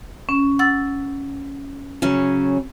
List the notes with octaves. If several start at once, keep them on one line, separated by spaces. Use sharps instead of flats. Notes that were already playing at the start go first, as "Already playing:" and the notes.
C#4
F#5 E6 A6
C#3 F#3 C#4